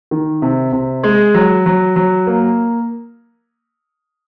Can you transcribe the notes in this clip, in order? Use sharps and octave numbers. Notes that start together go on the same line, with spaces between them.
D#3
C3
C3
G#3
F#3
F#3
F#3
A#3